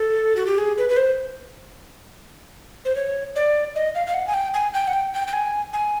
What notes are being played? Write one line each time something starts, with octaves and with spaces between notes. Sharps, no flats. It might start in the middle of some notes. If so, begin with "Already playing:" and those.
Already playing: A4
F#4
G4
G#4
B4
B4
C5
C5
C#5
D5
D#5
F5
F5
F#5
G#5
G5
G#5
G5
F#5
G5
G5
G5
G#5
G#5